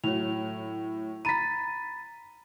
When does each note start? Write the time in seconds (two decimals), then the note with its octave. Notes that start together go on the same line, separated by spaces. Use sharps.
0.04 A2 F#3 C#5 F7
1.25 A#5 B5 A6 B6 D#7